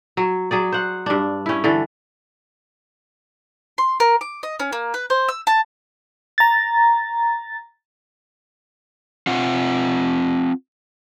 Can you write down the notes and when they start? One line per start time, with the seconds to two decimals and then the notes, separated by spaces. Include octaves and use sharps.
0.17 F#3
0.51 F#3 G#4 D5
0.72 C5 F#5
1.06 G2 D4
1.46 C#4 E4
1.64 D3 E3 A4
3.78 C6
4.00 A#4
4.21 D6
4.43 D#5
4.60 C#4
4.72 A#3
4.94 B4
5.10 C5
5.29 E6
5.47 A5
6.38 A#5 A6
9.27 C4 F4 F#5